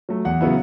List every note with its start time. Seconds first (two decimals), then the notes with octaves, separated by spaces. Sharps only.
0.09 F#3 A3
0.25 E2 F#5
0.41 C#3 F#3 B3 E4